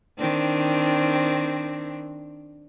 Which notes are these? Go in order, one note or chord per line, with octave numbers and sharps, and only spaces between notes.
D#3 C4 D4